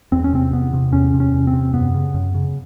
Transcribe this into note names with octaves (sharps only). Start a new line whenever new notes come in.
E2 C4
C#4
C3 C4
E2 B3
C3
E2 C#4
C3
C#4
E2
C4
C3
F#2 B3
C#3
F#2
C#3